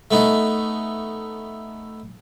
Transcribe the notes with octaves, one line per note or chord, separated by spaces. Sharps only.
A3 B3 D#4